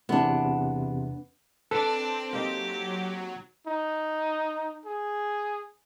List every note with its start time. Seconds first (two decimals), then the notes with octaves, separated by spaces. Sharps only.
0.09 E2 C3 B3 D4
1.71 C4 D4 A4 B4
2.33 F#3 A#3 D#4 G4
3.67 D#4
4.85 G#4